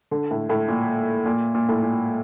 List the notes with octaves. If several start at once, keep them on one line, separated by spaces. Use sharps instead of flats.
D3
A2
A2
A#2
A#2
A#2
A2
A#2